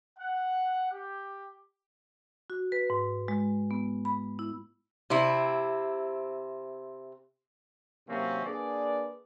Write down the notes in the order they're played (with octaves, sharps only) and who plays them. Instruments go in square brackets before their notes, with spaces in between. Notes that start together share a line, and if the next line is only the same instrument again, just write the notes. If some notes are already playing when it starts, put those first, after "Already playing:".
[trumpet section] F#5
G4
[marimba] F#4
B4
G#2
G#3
B3
B5
E4
[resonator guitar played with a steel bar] C3 C4 E4
[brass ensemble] C3 E3 F#3 A#3 C4 C#4
A#3 D4 G#4 B4 D5